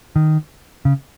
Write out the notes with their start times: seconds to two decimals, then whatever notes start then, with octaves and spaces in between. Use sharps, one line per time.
0.16 D#3
0.85 C#3